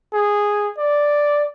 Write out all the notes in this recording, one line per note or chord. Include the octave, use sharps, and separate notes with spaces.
G#4
D5